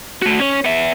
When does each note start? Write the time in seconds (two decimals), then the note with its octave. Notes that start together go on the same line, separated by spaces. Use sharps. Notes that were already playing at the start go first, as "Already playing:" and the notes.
0.22 A3 F#4
0.40 C#4 C#5
0.65 B3 E5